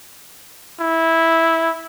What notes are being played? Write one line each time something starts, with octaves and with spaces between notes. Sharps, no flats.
E4